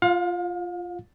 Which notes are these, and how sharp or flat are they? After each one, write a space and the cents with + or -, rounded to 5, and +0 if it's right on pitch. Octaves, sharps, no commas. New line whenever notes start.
F4 -5 F5 +35